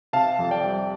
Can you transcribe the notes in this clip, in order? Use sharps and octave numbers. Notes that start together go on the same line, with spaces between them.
C3 F5 A5
F2
D5 G5
G3